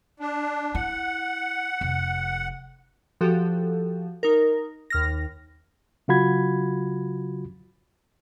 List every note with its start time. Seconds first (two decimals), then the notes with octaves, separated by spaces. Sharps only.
0.20 D4
0.75 E4 F#5
1.81 F1
3.21 F3 F#4 G4 A4
4.23 D#4 A#4
4.90 D#2 F6 A#6
6.08 C#3 F#3 F4 F#4 B5 G#6